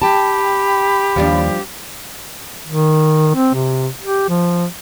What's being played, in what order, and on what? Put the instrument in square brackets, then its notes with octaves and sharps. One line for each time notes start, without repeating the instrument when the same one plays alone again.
[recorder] G4 [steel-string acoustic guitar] G5 A5 [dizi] B5
[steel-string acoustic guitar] D#2 [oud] F3 G3 D4
[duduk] D#3
C4
C3
G4
F3